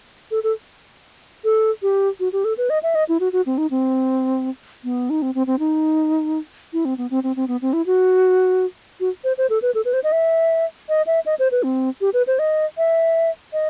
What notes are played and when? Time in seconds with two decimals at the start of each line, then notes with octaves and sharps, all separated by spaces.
0.31 A4
0.43 A4
1.44 A4
1.82 G4
2.20 F#4
2.33 G4
2.45 A4
2.58 B4
2.70 D#5
2.83 E5
2.95 D#5
3.09 E4
3.20 F#4
3.33 F#4
3.46 C4
3.58 D#4
3.71 C4
4.84 B3
5.10 D#4
5.22 C4
5.35 C4
5.47 C4
5.59 D#4
6.73 E4
6.85 C4
6.98 B3
7.11 C4
7.23 C4
7.36 C4
7.48 B3
7.62 C4
7.73 E4
7.86 F#4
9.00 F#4
9.24 C5
9.38 C5
9.50 A4
9.62 B4
9.75 A4
9.85 B4
9.93 C5
10.04 D#5
10.12 E5
10.89 D#5
11.07 E5
11.26 D#5
11.39 C5
11.52 B4
11.63 C4
12.01 G4
12.14 B4
12.27 C5
12.39 D#5
12.78 E5
13.53 D#5